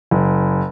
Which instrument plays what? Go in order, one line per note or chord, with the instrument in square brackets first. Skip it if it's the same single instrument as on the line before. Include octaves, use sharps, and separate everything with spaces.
[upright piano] F#1